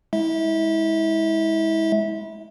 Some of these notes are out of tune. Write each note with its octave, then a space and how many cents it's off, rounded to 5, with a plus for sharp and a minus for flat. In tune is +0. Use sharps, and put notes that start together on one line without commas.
G#3 +0 E4 -30 E5 -25